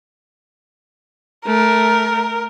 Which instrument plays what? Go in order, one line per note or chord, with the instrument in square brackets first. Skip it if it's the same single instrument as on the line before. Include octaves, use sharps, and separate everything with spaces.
[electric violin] A3 [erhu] A#4